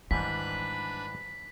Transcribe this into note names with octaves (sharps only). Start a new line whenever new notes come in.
G#2 D#3 E3 G3 D4 B4 B5 B6